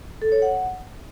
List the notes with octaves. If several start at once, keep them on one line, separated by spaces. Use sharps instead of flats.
A4
C#5
F#5